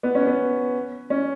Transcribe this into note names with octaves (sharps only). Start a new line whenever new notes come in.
B3
C#4
B3
C#4